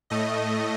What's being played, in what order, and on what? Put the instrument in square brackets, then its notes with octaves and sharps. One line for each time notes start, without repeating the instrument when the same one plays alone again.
[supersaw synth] A2 A3 D#5